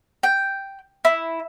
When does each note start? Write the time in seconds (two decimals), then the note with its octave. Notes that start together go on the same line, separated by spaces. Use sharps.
0.23 G5
1.05 E4